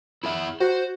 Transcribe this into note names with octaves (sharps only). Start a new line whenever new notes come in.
E4 G#4 E5
F#4 C5